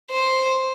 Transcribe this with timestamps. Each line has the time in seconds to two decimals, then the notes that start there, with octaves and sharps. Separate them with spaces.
0.11 C5